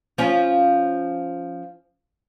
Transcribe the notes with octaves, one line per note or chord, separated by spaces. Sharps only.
F3 C#4